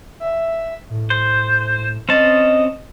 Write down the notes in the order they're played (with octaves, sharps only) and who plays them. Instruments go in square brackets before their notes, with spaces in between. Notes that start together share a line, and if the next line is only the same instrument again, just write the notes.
[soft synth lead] E5
A2
[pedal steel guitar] C5
[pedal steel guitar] C4 C#4 A5 [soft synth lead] D#5